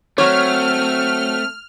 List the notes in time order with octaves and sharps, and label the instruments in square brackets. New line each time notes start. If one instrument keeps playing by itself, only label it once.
[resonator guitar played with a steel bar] F#3 C#5 [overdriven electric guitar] A3 [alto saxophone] C4 [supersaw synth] F6